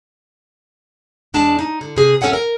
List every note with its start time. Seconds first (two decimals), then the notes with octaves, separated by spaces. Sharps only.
1.34 E2 G#3 D4 D5 A5
1.59 D#4
1.81 D3
1.96 C3 G#4
2.21 A3 C#4 A4 C#5 F#5 G#5
2.33 A#4